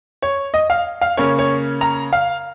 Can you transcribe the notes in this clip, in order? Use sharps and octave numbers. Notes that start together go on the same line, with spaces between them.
C#5
D#5
F5
F5
C#3 A#3 C#4 C#5
C#5
A#5
F5